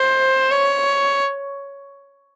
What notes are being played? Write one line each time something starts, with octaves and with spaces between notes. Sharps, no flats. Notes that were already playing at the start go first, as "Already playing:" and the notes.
Already playing: C5
C#5